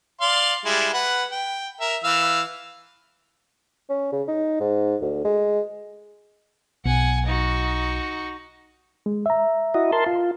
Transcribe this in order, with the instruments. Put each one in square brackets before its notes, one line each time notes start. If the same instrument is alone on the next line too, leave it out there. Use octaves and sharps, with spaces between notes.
[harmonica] D5 F5 C6
G3 G#3 E4
B4 F#5
G5
A#4 E5
E3 F5 E6
[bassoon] C#4
C#3
D#4
G#2
D2
G#3
[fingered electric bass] B1 [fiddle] F#5 G#5
[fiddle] D#4 F#4
[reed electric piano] G#3
E5 A#5
[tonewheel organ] E4 F#4 D#5
A#4 A5 C6
F4